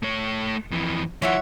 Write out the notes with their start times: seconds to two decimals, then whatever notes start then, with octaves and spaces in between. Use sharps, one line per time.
0.03 A3 C#5
0.71 F2 E3
1.22 F3 E4 C#5 E5 F#5